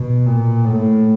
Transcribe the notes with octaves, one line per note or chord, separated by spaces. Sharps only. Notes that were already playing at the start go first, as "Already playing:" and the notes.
Already playing: B2
A#2
A2